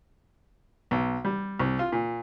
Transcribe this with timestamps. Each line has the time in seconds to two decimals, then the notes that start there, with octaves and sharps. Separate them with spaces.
0.91 B1
1.25 G3
1.60 C2
1.79 F4
1.92 A#2